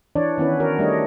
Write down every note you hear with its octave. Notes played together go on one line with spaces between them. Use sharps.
E3 D4 C#5 D5
D#3 B3 C#4 E4 B4
F#4 A#4 C#5
G3 A3 D4 C#5 D#5